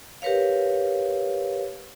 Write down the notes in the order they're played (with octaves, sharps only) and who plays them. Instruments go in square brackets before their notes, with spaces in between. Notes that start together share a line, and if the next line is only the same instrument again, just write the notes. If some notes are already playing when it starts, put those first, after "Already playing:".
[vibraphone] G4 A#4 B4 C#5 F5